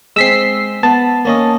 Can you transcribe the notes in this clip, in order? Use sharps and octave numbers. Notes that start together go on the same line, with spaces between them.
G#3 C4 E6 B6 C7
B3 A5
A#3 C#4 D#5